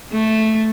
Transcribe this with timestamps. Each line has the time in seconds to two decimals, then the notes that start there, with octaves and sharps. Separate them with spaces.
0.12 A3